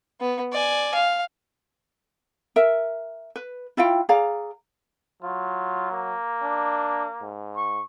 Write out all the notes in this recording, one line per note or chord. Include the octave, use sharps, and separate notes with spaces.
B3
D5 G#5
F5
A#4 E5
B4
E4 F4 F5 G5
G#4 D5 F5 A#5
F#3 F4
A#3
D4
G#2
C#6